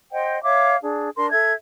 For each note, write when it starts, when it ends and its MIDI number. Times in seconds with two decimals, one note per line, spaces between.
0.12 0.42 72
0.12 0.42 75
0.12 0.42 78
0.12 0.42 79
0.43 0.76 73
0.43 0.76 76
0.43 0.76 77
0.43 0.76 86
0.83 1.10 62
0.83 1.10 68
1.17 1.29 62
1.17 1.29 70
1.17 1.29 84
1.30 1.52 69
1.30 1.52 76
1.30 1.52 92